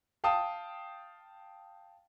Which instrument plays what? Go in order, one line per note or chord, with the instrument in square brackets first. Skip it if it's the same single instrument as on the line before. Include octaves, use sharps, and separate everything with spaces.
[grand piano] F5 G5 A5 D#6